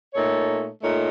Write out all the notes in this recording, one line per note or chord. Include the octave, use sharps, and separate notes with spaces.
A#2 A3 D#4 A4 C#5
A#2 A3 D#4 A4 C#5